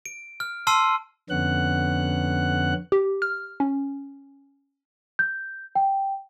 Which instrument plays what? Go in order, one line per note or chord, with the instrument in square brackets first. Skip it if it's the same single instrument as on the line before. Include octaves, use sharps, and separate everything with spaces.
[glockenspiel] D7
F6
A5 C6 E6 F6 C7 D#7
[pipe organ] F2 D3 B3 C#4 F#5 F#6
[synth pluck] G4
F6
C#4
[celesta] G6
G5